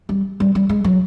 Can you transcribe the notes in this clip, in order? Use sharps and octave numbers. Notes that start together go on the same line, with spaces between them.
G3
G3
G3
G#3
F#3